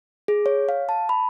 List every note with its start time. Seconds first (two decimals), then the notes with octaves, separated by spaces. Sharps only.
0.28 G#4
0.46 C#5
0.69 F5
0.89 A5
1.09 B5